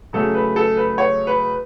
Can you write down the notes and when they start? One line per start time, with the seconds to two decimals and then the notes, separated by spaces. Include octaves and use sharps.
0.13 C#3 F#3 A3 A4
0.35 B4
0.56 A4
0.77 B4
0.98 C#5
1.27 B4